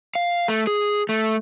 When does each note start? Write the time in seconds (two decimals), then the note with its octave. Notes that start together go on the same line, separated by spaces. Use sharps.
0.15 F5
0.48 A3
0.67 G#4
1.09 A3